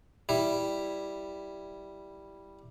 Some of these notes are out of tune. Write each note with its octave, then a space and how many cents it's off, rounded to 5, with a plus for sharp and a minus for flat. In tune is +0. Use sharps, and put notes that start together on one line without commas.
G3 +0 E4 +0